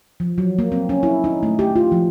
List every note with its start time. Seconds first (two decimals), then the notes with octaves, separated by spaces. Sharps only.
0.20 F3
0.38 F#3
0.59 A#3
0.72 C4
0.89 C#4
1.03 E4
1.24 D#4
1.43 A3
1.59 G4
1.76 F4
1.92 F3